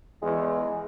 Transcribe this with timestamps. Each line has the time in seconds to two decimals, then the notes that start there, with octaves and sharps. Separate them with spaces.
0.22 E2 G#3